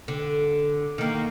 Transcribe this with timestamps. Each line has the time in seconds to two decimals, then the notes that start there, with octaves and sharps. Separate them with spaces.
0.08 D3
0.98 D#3 A#3